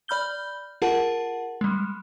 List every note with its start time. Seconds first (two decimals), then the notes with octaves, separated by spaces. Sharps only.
0.08 D5 B5 F6 G6 G7
0.82 F4 G#4 A#4 F#5 A5
1.61 G3 G#3